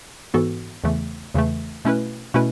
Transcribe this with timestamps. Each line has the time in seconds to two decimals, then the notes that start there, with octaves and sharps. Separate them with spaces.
0.34 G#2 E3 B3 F#4 A4
0.84 E2 C#3 E3 A3
1.34 E2 C#3 E3 A3
1.85 B2 A3 C#4 E4 B4
2.34 B2 A3 C#4 E4 B4